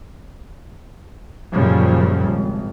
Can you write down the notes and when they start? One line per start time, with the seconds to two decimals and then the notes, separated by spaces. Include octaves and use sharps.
1.52 F#2 A#2 C#3 F3 G3
2.29 G#1